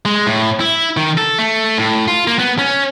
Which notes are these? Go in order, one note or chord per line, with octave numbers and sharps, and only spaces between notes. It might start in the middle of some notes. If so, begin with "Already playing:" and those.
G#3
A2
E4
D#3
A4
A3
A2
F4
A#3
B3
C#4